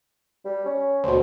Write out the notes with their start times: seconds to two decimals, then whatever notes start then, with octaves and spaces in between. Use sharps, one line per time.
0.45 G3
0.65 C#4
1.04 D2 B2 C5